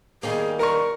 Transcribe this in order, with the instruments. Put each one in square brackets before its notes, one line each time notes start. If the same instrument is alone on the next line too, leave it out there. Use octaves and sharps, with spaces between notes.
[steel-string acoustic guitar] D#3 G3 A#3 [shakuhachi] G#4
[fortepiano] A#4 C#6 [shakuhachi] D5